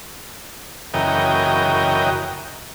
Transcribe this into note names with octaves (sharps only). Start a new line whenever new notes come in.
F#2 C#3 E3 A#4 D#5 G5